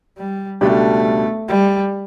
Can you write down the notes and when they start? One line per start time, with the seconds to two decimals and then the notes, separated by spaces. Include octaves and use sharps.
0.17 G3
0.61 C#2 B2 G3 A3 D4 G4
1.48 G3